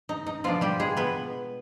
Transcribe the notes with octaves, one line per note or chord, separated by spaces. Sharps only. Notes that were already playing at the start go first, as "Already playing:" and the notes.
D#4
D#4
B2 F3 G#3 D4 F4
G3 G4
G#3 G#4
B3 B4